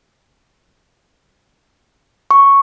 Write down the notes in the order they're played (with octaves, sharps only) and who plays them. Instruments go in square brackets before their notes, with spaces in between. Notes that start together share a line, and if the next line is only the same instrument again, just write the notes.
[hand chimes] C#6